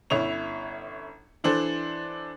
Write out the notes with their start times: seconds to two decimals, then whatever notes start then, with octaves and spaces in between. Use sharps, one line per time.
0.10 G1 C#4 E4 C#5 F7
1.44 E3 D4 A4 C5